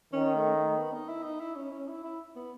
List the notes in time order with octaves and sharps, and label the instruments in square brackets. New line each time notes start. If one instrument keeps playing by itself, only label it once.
[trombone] D#3 [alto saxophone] C#4
[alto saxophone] A3
A3
B3
D#4
E4
D#4
E4
C#4
C#4
E4
E4
B3